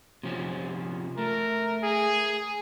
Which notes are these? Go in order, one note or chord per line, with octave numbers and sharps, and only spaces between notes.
C3 F3 C#4
A3 A#4
G#4